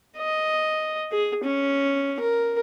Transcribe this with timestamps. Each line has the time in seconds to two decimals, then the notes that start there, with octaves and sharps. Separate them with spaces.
0.17 D#5
1.11 G#4
1.44 C#4
2.20 A#4